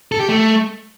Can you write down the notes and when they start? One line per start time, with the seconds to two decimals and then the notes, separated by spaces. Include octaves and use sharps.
0.12 A4
0.20 G4
0.29 A3